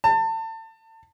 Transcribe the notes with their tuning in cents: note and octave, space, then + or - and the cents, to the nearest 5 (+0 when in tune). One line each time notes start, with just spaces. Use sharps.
A5 +30